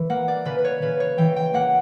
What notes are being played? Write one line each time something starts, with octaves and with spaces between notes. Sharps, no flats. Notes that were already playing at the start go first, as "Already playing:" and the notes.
Already playing: E3
A#3 F#5
D5
C#3 B4
B4
C#5
C#3 B4
C#5
E3 G5
G5
A#3 F#5